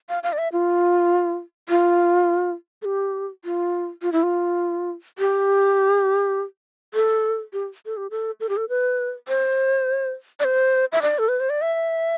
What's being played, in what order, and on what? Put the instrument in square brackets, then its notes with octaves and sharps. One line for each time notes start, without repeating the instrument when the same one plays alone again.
[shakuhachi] F5
F5
D5
E5
F4
F4
A4
G4
F4
F4
E4
F4
G4
A4
G4
A4
G4
A4
A4
G4
A4
B4
C5
D5
C5
E5
D5
A4
B4
C5
D5
E5